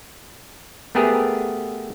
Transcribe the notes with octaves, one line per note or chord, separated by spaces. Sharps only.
A3 B3 G4 G#4 A#4